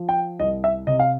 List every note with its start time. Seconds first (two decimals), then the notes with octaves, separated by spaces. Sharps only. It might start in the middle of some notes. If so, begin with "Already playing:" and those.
Already playing: F3
0.09 G5
0.40 C2 D#5
0.64 E5
0.87 C3 D#5
0.99 F5